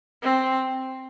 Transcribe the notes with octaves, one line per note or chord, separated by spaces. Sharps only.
C4